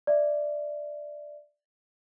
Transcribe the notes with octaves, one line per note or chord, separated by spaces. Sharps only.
D5 E5